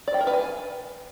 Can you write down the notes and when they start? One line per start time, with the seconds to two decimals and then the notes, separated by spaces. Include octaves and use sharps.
0.08 D5
0.14 G5
0.21 A#4
0.27 B4
0.34 G#5